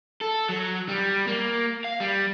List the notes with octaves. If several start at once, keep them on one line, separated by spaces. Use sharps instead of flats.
A4
F#3
G3
A#3
F5
G3